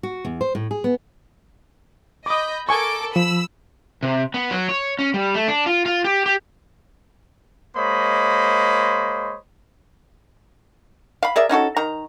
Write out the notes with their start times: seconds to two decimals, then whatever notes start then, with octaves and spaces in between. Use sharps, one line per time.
0.03 F#4
0.25 E2
0.41 C5
0.55 A2
0.71 G#4
0.84 B3
2.26 D#5 B5 D6 D#6 G6
2.69 A4 A#4 G#5 C#6 D6
3.16 F3 B5 E6
4.03 C3
4.34 B3
4.51 F#3
4.69 C#5
4.99 C#4
5.14 G3
5.34 A3
5.48 D4
5.66 F4
5.86 F4
6.04 G4
6.26 G4
7.77 G#3 A#3 C5 C#5 D#5 B5
11.23 F5 B5
11.36 G#4 A#4 D5 E5
11.49 C#4 D#4 F#4 A4
11.77 D#3 A#5